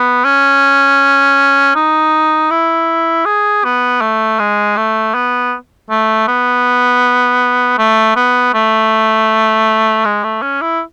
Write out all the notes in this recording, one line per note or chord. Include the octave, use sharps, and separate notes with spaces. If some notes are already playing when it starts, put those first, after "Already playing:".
Already playing: B3
C#4
D#4
E4
G#4
B3
A3
G#3
A3
B3
A3
B3
A3
B3
A3
G#3
A3
C#4
E4